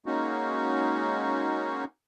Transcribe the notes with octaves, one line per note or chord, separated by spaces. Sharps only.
G#3 A#3 C#4 D#4 F#4